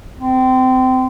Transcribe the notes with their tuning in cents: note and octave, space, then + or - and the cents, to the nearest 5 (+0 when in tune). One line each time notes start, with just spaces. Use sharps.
C4 -25